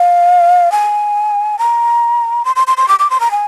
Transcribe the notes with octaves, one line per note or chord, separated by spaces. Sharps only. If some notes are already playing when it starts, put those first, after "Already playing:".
Already playing: F5
G#5
A#5
C6
C6
C6
C6
D6
D6
C6
A#5
G#5